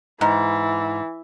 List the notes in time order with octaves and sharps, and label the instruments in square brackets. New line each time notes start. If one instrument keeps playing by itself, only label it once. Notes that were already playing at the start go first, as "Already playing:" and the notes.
[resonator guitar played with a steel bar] G#2 [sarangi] E3